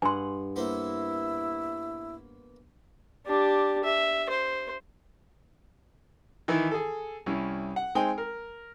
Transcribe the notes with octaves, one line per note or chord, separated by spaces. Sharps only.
G2 G#4 F#5 G#5 C6
A#3 B3 E4 C5
D4 G4
E5
C5
D#3 E3 E4
G#4 A4
C2 C#4 E4
F#5
G#3 C4 D#4 G5 G#5
A#4